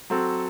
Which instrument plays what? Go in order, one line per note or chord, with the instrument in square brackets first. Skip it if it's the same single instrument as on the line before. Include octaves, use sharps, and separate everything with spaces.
[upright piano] F#3 C4 F#4 A4